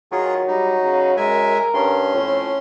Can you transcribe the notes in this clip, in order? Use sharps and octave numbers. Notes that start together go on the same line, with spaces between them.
D#3 F#3 F4 G#4
G3 D#4
C#3
F#2 G#3 A#4 E5 G#5
G2 C#4 C6
F2 A2